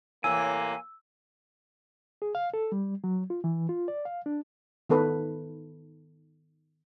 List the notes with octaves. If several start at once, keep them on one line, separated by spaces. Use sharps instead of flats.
A2 C3 E3 A#3 G#5 E6
G#4
F5
A4
G3
F#3
F4
E3
F4
D5
F5
D4
D#3 B3 A4 B4